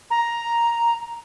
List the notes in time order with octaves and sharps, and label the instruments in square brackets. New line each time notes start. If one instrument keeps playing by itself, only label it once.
[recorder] A#5